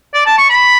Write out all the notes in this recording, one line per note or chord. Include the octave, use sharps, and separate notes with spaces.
D5
A5
C#6
B5